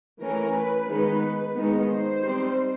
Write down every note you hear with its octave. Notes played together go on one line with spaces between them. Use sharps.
E3 A3 C#4 A#4
B4
D#3 G#3 B3 D#4 B4
D#3 G#3 B3 D#4
C5
G3 C4 D#4